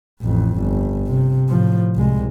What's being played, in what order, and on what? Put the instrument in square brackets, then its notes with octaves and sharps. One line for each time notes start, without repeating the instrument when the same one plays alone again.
[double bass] A1 F2
G1
C3
A2 F3
C2 G#3